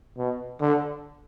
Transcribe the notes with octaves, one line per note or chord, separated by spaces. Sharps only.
B2
D3